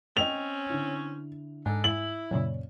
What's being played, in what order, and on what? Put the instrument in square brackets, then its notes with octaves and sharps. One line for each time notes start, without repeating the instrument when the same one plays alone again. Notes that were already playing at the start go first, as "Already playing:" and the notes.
[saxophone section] C4 C#4 [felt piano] D#5 G5 [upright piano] F7
[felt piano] D3 E4
[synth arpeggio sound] G#2 [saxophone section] D4 D#4 A4 [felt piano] G#5
[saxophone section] E4 [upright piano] F#7
[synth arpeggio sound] F#2 A#2 C#3 [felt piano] C#5 D5